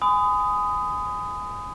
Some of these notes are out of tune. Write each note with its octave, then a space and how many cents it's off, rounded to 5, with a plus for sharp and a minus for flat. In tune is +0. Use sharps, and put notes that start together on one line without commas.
G#5 +0 B5 +40 D#6 +0